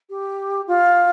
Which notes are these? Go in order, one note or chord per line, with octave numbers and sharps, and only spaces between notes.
G4
F4